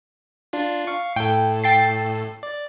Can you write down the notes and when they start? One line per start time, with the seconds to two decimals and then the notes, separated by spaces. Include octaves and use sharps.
0.53 D4 F4
0.87 F5 C#6
1.16 A2 A4 G5
1.64 G5 A6 C7
2.43 D5